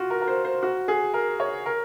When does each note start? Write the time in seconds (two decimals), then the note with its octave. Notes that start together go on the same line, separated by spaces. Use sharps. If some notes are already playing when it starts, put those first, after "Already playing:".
Already playing: F4 F#4
0.10 A#4
0.21 A#4
0.28 C5
0.45 C5
0.63 F#4
0.88 G#4
1.14 A#4
1.40 C#5
1.66 A#4